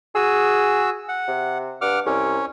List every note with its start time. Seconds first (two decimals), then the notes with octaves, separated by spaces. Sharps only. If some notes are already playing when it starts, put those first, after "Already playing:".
0.15 F#4 G#4 E6
1.09 F#5
1.28 C3
1.81 G2 F#5 D6 F6
2.06 C2 C#4